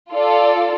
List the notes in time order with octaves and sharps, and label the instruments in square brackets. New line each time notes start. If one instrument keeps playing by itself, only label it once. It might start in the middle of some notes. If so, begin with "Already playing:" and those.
[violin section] F4 A4 D5